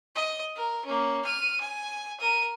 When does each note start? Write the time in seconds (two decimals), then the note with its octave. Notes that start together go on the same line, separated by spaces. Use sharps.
0.15 D#5
0.55 A#4
0.85 A#3 C#4
1.24 F6 D#7
1.60 G#5
2.20 A#4 D#7